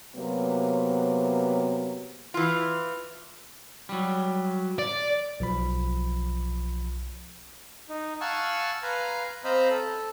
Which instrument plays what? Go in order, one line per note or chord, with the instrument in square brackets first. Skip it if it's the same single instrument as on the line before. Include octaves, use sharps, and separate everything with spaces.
[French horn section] C3 F#3 A#3 B3
[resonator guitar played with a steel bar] E3 F4
[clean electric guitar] F#3 G3
[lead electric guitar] D5
[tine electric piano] B1 F3 B5
[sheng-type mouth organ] D#4
F5 F#5 G#5 A5 C#6 E6
B4 F5 G#5 A#5 C6
C4 C5 D#5 F5 A#5 B5
A4